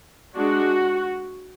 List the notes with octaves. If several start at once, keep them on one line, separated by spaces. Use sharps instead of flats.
G#3 D4 F#4